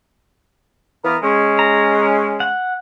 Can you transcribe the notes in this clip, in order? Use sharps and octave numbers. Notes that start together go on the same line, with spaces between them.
E3 B3 A#4
G#3 C#4
A#5
F#5